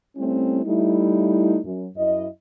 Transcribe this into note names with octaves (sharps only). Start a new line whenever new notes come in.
G3 A3 C4 C#4 E4
G3 A3 D#4 E4
F#2
F#2 E4 D#5